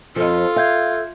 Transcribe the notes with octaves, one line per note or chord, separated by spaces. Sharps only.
F2 F3 F4 A4
E5 F5 G6 G#6